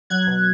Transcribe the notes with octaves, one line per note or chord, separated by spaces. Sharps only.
F#3 F#6 G#6
B2